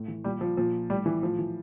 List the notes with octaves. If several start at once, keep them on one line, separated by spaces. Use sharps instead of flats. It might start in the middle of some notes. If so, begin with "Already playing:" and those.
Already playing: A2
E3
A#2 G3
F3
A#2 F3
A2 G3
E3
A2 F3
E3